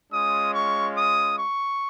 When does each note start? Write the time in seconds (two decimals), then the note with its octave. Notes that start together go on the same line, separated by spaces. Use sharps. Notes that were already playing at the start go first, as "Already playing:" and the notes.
0.13 G#3 C#4 F4 D#6
0.54 C#6
0.96 D#6
1.37 C#6